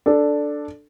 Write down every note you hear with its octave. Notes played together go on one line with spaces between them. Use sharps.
D4 A4